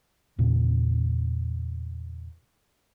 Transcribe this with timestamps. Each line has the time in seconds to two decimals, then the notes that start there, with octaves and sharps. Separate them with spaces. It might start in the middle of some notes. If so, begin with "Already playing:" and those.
0.38 E2 A#2 C#3